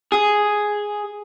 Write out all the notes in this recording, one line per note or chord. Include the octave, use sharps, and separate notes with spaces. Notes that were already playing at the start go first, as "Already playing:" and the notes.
G#4